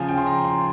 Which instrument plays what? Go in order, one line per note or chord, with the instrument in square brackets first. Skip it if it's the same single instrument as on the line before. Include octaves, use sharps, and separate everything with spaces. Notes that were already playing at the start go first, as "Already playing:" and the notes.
Already playing: [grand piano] C#3 F3 G#5
G5
C6
A#5
C6